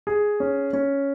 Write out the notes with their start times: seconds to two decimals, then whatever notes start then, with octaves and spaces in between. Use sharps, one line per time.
0.07 G#4
0.40 C#4
0.73 C#4